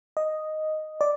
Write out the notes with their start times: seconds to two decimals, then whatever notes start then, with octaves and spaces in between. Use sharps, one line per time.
0.17 D#5
1.01 D5